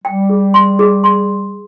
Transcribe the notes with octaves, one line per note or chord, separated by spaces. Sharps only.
G3 G5
G#4
C6
G#4
C6